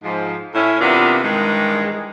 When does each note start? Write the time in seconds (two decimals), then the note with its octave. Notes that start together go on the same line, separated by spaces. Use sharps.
0.04 G#2 F3
0.55 A2 C#4 E4
0.81 C3 E3 B3 D4 F4 A#4
1.23 G2 D#3 E3 G#3